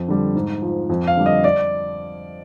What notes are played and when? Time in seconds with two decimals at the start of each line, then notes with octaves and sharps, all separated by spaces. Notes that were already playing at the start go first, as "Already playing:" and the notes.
Already playing: F2
0.08 D3 G3
0.35 G#2
0.62 F3
0.90 F2
1.07 F5
1.17 D3 G3
1.26 D#5
1.44 D5